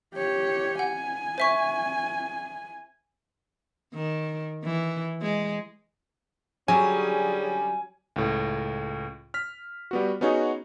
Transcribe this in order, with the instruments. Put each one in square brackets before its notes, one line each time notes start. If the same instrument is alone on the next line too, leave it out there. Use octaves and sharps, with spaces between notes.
[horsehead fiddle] G4 C#5
[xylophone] F#5 [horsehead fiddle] G#5
[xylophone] C5 E5 C#6
[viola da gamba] D#3
E3
G#3
[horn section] D3 G3 C#4 [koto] F#3 [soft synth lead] G#4 [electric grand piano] G#5
[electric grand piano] C#2 A2
F6 B6
G3 B3 F#4
B3 C#4 D#4 F#4 G#4 C#5